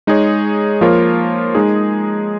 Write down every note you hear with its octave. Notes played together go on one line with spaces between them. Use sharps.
G#3 D#4 G#4 C#5
F3 A#3 F4 A#4 C#5
G#3 D#4 G#4